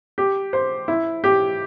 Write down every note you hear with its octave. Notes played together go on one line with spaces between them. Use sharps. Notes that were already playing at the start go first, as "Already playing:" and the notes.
G4
C5
E4
G4